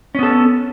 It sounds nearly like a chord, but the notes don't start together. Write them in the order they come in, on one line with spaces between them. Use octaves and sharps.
C#4 B3 A4